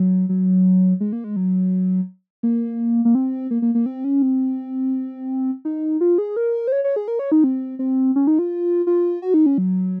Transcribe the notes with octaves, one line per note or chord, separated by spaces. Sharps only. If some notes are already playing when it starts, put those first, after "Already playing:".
Already playing: F#3
F#3
G#3
A#3
G#3
F#3
A#3
A#3
C4
A#3
A#3
A#3
C4
C#4
C4
D#4
F4
G#4
A#4
C5
C#5
C#5
G#4
A#4
C#5
D#4
C4
C4
C#4
D#4
F4
F4
F#4
D#4
C#4
F#3